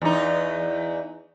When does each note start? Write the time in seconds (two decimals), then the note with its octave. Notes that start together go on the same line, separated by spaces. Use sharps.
0.02 E2 D#4